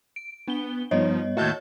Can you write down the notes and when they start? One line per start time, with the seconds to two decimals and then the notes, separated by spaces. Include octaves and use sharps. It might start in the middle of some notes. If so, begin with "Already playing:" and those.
0.16 D7
0.48 B3 D4 G7
0.91 G2 F3 G3 B3 D#4 C#5 D#5
1.37 D#2 A2 F#4 A5 G6